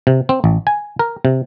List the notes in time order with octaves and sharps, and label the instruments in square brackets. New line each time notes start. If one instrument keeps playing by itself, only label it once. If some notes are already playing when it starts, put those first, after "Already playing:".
[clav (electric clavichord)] C3
C4
A1
G#5
A#4
C3